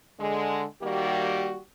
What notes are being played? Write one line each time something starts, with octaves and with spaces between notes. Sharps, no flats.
D3 G#3
D#3 G3 A#3 F#4 G4